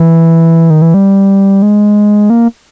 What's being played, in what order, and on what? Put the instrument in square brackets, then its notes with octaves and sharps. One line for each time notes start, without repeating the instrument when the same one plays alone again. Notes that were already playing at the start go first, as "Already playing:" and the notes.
Already playing: [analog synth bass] E3
D#3
E3
G3
G#3
A#3